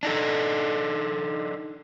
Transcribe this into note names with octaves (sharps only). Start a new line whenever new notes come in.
D4 D#4 A4